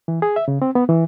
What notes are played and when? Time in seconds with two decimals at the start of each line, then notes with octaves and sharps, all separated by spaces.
0.08 E3
0.22 G#4
0.36 E5
0.48 C#3
0.62 C4
0.75 B3
0.89 E3